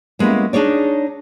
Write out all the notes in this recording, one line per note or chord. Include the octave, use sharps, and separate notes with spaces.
G3 G#3 A#3 B3 C#4 E4
D4 D#4 G#4 C#5 D5